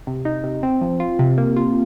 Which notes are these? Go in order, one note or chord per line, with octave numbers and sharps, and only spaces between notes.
C3
D#4
C3
C4
F3
F4
C3
A#3
F4